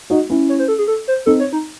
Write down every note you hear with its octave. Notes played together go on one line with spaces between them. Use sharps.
D#4 F#4
C#4 E4
C#5
C5
A4
G#4
A4
C5
C4 D#4 A4
C#5
D#4